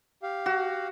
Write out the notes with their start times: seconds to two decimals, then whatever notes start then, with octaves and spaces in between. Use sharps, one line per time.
0.23 G4 F5
0.46 F#4